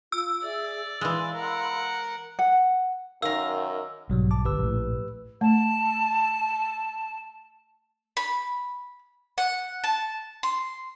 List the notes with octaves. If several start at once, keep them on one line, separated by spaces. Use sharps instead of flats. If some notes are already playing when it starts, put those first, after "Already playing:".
F4 E6
G#4 D5 E5
E3 G#3 F5 B5 C6
A#4 F#5
F#5
F#2 D#3 A#4 F5 E6
B1 G#2 F#3 G3
A5 D6
G1 G4 B4 E6
A#1 A2
A3 A5
B5
F#5
A5
C6